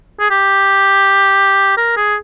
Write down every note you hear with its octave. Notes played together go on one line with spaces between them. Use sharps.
G#4
G4
A#4
G#4